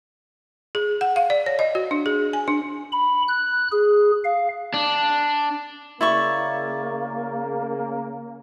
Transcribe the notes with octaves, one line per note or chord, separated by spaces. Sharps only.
G#4
F#5
F5
D5
C#5
D#5
F#4
D4
G#4
G#5
D4
B5
F#6
G#4
F5
D4
C#3 A#3 E4 D5 C#6